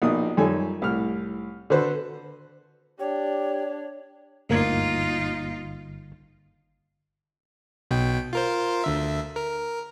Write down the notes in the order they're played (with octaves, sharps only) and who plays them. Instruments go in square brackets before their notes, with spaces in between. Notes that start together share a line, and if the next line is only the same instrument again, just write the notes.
[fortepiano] A#1 B2 D#4 D#6
F#2 F3 G3 D#4 A4 G#5
C2 A2 F6
D3 F#4 A4 B4 C5
[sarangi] D4 [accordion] G4 [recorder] C#5
[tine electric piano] G1 [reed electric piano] D2 A#3 G#6 [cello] D#4 F4
[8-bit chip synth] B1 B2 G5
F4 A#4 C5
D2 D3 E5
A#4